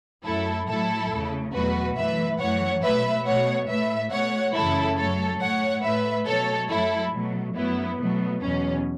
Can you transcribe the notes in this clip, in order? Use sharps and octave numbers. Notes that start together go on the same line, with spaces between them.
F#2 F#3 A3 E4 A4
A2 F#3 A3 E4 A4
E2 C#3 A3
E2 B2 F#3 A3 F#4 B4
F#2 E3 A3 B4 E5
F#2 E3 A3 C#5 F#5
B2 F#3 A3 B4 E5
B2 A3 C#5 F#5
A2 A3 B4 E5
B2 A3 C#5 F#5
F#2 C#3 E3 A3 E4 A4
F#2 F#3 A3 A4 C#5
A2 A3 C#5 F#5
A2 A3 B4 E5
B2 F#3 A3 A4 C#5
F#2 F#3 A3 E4 A4
B2 F#3 A3
F#2 F#3 A3 B3 E4
B2 F#3 A3 B3
E2 B2 F#3 C#4